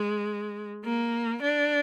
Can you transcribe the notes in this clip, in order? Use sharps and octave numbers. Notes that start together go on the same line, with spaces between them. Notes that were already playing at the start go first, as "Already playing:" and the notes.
Already playing: G#3
A#3
D4